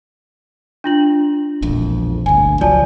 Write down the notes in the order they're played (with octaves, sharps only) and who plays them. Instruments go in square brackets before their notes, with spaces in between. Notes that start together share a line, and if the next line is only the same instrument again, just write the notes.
[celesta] D4 F4 F#7
[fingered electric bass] E1 A#1 F2
[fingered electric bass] G1 D2 [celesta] G#5
[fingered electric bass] C#2 F3 F#3 [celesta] D5 G#5 A5